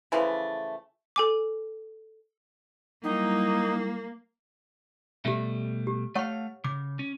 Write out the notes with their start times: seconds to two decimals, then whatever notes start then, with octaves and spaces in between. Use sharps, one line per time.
0.12 C#3 E3 F3 A3
1.16 A4 G#5 D6
3.04 F#3 G3 A#3 D#4 E4
5.25 B2 G3 A3 G4 E5
5.87 G4
6.15 A3 C#5 F5 F#5 C#6
6.64 C#3 D6
6.99 C#4